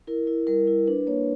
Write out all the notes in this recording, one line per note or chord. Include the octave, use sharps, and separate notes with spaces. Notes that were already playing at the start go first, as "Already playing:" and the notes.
E4 A#4
E4
G3 A#4
E4
D4 B4
A#3 C#5